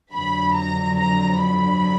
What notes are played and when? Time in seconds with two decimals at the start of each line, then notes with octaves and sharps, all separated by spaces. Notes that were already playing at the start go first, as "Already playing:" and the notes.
0.12 F2 D3 F#3 B5
0.55 A#5
0.97 A#5
1.40 B5